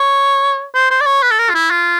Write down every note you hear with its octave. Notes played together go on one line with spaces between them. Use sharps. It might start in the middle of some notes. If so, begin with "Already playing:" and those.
Already playing: C#5
C5
C5
D5
C#5
B4
A4
A#4
F4
E4
F4